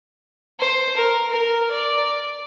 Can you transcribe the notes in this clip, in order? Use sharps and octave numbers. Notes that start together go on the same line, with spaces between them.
C5
A#4
A#4
D5